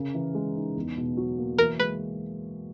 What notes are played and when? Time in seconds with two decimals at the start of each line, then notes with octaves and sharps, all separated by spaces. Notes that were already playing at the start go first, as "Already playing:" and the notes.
Already playing: C#3 A#4
0.14 E3
0.35 G#3
0.55 D#4
0.76 E2
0.97 B2
1.17 F#3
1.38 A#3
1.58 E3 A#4
1.79 G#3 B4